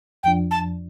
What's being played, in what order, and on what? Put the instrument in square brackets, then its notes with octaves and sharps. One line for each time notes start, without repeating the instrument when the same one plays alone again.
[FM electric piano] F2 F3 D4 [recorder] G5
[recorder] A5